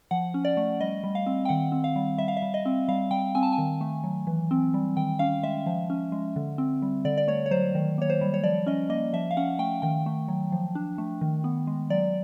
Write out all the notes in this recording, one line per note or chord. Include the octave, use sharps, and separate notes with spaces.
F3 F#5
C#4
D5
A3
G3 D#5
G3
F5
C4
G5
D#3 F#5
C4
F5
G3
G3 E5
F5
E5
G3
D#5
C4
G3 F5
G3 G5
C4 G#5
A5
G#5
D#3
A3
F#3
E3
C4
G3
D#3 G5
C#4 F5
G#3 E5
F3
C#4
G#3
D3
C4
G3
D3 D5
D5
A3 C#5
C#5
F#3 C5
D#3
A#3 C#5
C5
G3
C#5
F3 D5
C#4 D#5
A#3 D#5
F3 E5
F5
C#4 F#5
A3 G5
D#3 G5
A3
F#3
F3
D4
A3
D#3
B3
G#3
F#3 D5